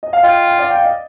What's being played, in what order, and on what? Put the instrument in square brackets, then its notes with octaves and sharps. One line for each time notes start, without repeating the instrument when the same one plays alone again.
[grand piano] D#5
F5
[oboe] F4 [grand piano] D#5 G5
[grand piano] G5
D5 F5
G5
F5
D#5